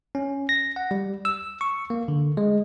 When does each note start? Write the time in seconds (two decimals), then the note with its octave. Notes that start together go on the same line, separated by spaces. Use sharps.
0.15 C#4
0.49 A#6
0.76 F#5
0.91 G3
1.25 E6
1.61 C#6
1.90 A#3
2.08 D3
2.37 G#3